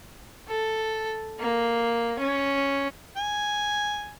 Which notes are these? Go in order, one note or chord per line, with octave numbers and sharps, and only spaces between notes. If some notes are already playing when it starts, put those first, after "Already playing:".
A4
A#3
C#4
G#5